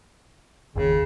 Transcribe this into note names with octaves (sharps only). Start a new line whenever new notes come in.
G1 D#2 C#3